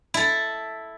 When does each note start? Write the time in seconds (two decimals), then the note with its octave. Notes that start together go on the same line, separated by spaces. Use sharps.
0.14 E4 A4